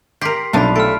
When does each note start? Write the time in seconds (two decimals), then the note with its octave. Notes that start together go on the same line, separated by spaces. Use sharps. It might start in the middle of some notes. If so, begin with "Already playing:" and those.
0.21 G4 A#4 C6 B6 C7
0.53 B1 C3 F3 D4 A5 B5
0.76 A3 A4 F6 D7